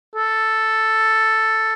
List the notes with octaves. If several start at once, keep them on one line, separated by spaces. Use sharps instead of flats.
A4